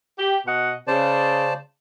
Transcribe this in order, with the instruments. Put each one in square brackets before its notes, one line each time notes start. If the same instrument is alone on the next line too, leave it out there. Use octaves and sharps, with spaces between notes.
[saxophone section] G4
B2 D#5 F#5
[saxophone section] C#3 [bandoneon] C5 D5 A5